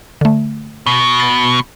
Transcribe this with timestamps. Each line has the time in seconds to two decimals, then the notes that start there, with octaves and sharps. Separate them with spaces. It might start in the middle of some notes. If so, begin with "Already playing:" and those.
0.21 D3 A3
0.86 B2
1.20 A6